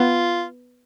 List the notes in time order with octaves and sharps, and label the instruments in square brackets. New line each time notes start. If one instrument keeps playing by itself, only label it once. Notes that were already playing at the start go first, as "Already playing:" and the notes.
Already playing: [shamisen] B3 [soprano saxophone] F4